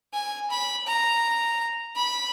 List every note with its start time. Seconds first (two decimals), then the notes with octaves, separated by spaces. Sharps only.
0.14 G#5
0.50 B5
0.87 A#5
1.96 B5